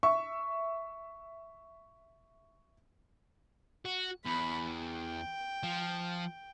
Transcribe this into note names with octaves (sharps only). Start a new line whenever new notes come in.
E5 C#6
F#4
E2 B5
G5
F3